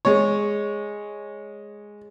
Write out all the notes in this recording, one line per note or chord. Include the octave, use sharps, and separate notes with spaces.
G#3 C#5